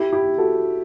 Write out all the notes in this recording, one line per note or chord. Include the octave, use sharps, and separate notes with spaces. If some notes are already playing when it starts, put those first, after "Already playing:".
Already playing: E4 G4
E4 G4
F#4 A4